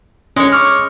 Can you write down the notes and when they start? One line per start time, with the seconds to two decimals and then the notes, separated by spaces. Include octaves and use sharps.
0.36 G#3 C#4 C#5
0.53 C#6 D6 F6